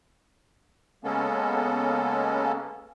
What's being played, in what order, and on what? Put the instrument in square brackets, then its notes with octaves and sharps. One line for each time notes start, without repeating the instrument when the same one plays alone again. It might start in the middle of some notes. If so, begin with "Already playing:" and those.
[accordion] C#3 G#3 A#3 B3 C#4 A4